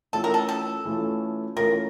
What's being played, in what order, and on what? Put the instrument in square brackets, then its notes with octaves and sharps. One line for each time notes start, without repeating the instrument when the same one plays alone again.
[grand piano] E3 A3 C#4 F4 [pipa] A4
[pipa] A#4
A4
A4
[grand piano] E3 A3 C#4 F4
[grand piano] E3 A3 C#4 F4 [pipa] A#4